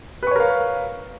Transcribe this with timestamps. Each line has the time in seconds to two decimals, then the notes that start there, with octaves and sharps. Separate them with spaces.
0.23 B4
0.27 C#6
0.31 C#5
0.36 A#4
0.40 F5